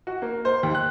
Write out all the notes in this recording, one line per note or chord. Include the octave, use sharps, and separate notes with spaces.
F#4
A#3
C5
D#2
F#6